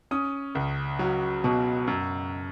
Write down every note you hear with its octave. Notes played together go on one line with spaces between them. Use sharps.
C#4 D#6
C#2
F#3
B2
F#2